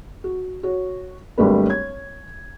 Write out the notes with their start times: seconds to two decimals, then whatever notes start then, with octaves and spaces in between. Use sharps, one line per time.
0.24 F#4
0.63 F#4 C#5
1.38 G#1 G3 A3 D4 B4
1.66 C#5 G#6